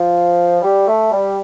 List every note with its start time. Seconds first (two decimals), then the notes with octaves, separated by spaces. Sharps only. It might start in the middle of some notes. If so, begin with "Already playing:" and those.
Already playing: F3
0.62 G3
0.86 A3
1.12 G3